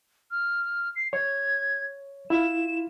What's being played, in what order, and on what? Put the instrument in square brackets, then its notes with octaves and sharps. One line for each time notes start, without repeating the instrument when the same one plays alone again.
[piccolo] F6
C7
[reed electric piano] C#5 [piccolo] G#6
[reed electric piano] E4 F4 [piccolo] E7